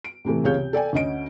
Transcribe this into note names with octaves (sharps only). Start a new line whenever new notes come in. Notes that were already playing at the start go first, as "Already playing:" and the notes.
D7
A2 C3 E3 A3
C#2 C3 G#4 C#5 F5 G6
C3
A4 D5 G5 G#5
D2 C#4 D#5 D7